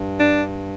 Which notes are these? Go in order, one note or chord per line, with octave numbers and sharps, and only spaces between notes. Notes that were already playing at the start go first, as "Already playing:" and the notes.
Already playing: G2
D4